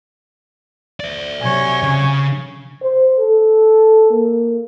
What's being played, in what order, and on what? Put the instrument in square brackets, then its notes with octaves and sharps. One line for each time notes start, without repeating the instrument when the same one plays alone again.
[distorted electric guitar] D5 E5
[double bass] C3 F#3 [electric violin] C#5 G#5
[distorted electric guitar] C#3
[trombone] C5
A4
A#3